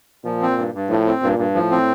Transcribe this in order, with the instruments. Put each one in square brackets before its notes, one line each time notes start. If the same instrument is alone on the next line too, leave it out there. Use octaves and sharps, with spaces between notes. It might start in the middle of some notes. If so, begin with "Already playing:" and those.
[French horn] A#2 [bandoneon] F3
[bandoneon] C4
G2
G2
[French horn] A2 [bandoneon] F3
[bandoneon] C4
[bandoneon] G2 [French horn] A#2
[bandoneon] G2
[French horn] A2 [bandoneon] F3
[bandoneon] C4